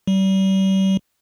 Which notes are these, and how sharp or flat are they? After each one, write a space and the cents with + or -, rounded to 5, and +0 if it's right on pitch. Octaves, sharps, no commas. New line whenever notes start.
G3 -35